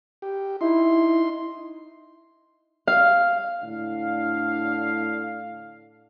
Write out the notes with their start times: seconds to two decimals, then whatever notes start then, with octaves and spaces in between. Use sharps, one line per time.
0.22 G4
0.61 D#4 E4 C6
2.87 F5
3.62 A2 D3 D4 F5